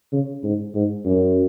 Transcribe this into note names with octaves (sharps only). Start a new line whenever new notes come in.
C#3
G#2
G#2
F#2